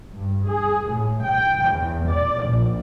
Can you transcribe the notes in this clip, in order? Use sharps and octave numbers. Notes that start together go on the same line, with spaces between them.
G2
G#4
A2
G5
E2
D5
A#1